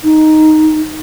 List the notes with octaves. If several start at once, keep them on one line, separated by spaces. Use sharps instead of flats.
D#4